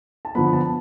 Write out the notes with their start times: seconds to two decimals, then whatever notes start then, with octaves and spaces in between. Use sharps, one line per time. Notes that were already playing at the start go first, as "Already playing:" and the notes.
0.25 A5
0.35 D3 F3 B3 B5
0.53 A5